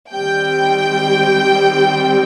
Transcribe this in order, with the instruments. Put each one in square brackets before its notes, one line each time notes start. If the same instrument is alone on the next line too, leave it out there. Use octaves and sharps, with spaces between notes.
[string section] D#3 G3 C4 G5